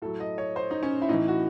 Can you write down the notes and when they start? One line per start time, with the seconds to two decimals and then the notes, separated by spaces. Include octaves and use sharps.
0.02 A2 F#3 A4
0.20 D#5
0.38 C#5
0.56 C5
0.71 D#4
0.83 C#4
1.02 E4
1.09 A2 E3 D#4
1.28 F#4